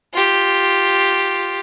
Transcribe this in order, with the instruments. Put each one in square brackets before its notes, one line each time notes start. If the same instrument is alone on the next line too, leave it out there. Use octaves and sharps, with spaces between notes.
[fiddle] F4 G4